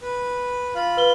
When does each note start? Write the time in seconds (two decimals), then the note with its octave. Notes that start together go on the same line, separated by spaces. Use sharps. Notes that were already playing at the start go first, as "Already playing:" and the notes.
0.01 B4
0.75 F4 F5 B5
0.97 B4 G7